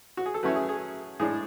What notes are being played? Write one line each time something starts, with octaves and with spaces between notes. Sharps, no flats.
F#4
G#4
A4
F#3 A3 C#4 E4 B4
G#4
G#4
A2 G#3 D4 G#4